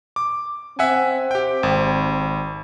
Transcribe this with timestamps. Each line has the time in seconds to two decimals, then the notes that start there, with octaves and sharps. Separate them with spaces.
0.16 D6
0.79 C4 E5 F#5 G#5
1.31 G4 G5
1.63 G#1